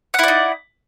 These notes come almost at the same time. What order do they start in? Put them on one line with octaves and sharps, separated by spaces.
F#5 E4 D5 D#4